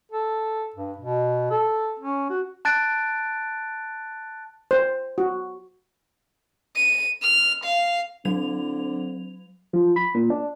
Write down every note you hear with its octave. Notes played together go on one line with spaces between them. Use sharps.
A4
G2
B2
A4
C#4
F#4
A5 F#6 A6 D7
C5
F#4
D#7
F6
F5
D3 F#3 C4 F7
F3
B5
A#2
D4